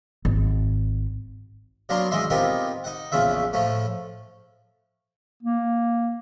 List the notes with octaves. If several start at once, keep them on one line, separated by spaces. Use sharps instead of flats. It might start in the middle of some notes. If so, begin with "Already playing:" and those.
G#1
F#3 A#3 B3 D4 A#5 C6
C#2 E3 D#5 E5 C6
B3 C4 D#4 F4 G4 A#4
D#4 F#5
A#1 E2 C#3 F4 E5
A2 F3 A3
A#3